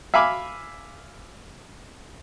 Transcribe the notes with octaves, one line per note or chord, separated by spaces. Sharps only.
E5 F5 G#5 B5 D6